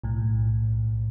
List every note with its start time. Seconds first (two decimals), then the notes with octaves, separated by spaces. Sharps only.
0.04 B1 A2